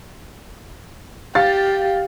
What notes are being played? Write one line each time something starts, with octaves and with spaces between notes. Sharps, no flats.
G4 F5 A6